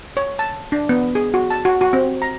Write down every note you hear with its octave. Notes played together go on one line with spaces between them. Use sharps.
C#5
A5
D4
B3
G#4
F#4
A5
F#4
F#4
C4
A#5